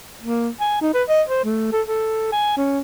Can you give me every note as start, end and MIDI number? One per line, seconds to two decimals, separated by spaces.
0.23 0.49 58
0.61 0.80 80
0.82 0.92 63
0.94 1.03 71
1.09 1.22 75
1.29 1.44 72
1.44 1.72 57
1.72 1.82 69
1.88 2.29 69
2.32 2.56 80
2.57 2.79 61